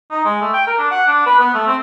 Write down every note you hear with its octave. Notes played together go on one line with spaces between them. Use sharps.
D#4
G#3
A3
G5
A#4
D4
F#5
D4
B4
B3
A3
C4